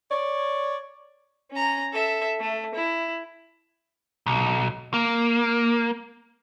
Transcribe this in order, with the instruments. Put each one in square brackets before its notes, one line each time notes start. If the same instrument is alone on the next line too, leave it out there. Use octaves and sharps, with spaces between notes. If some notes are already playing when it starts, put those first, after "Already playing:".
[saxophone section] C#5 D5
[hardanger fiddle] C#4 A#5
A4 E5
A3
E4
[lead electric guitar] B1
A#3